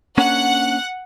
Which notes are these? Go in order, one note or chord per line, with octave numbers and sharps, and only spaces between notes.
A#3 C#4 D4 F#5